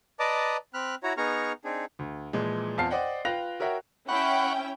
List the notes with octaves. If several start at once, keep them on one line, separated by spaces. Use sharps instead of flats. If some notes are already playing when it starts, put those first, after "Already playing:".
B4 D5 D#5 A5 A#5 D6
C4 B5 F6 F#6
E4 F#4 C#5 A#5
B3 D#4 G#4 A#5 C#6 F6
C4 D4 D#4 G#4
D2
A#2 E3 F3 G#3
E2 C4 F4 A5 F6 C7
C5 D5 D#5 F#5 G5
F4 B4 G5 F#6 A#6 F7
F#4 A#4 C#5 E5 F#5 G5
C#4 E4 F#5 G5 B5 C#6